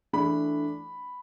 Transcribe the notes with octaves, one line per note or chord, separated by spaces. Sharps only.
E3 A3 D4 B5